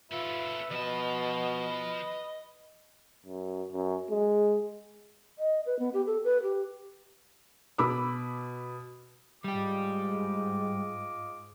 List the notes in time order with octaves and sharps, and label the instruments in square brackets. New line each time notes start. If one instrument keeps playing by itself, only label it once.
[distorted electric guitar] C#4 A4 [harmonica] F4 E5 [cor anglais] B4
[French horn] B2 [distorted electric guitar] F3 A5 [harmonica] D#5
[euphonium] F#2
F#2
G#3
[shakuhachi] D#5
B4
B3
G4
A4
B4
G4
[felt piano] B2 B5 D6 E6
[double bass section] G#2 G#3 [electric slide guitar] G3 G4 [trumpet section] F4 D#5 D6